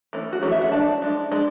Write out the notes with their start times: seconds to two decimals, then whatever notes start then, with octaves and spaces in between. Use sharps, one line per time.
0.13 E3 A3 C#4
0.33 F#4
0.42 E3 A3 C#4 G#4
0.52 E5
0.61 F#5
0.72 G#3 D4 A5
1.02 G#3 D4
1.32 G#3 D4